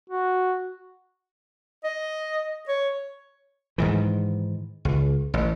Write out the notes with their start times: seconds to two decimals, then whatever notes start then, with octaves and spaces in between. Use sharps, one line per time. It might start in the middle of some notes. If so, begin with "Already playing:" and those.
0.10 F#4
1.84 D#5
2.69 C#5
3.78 G#2 D#3 E3
4.85 C#2
5.34 A1